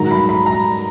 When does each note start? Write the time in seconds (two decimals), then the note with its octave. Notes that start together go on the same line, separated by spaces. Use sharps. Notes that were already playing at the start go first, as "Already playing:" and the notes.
Already playing: G#2 D#3 F#3 A#5
0.11 B5
0.29 B5
0.46 A#5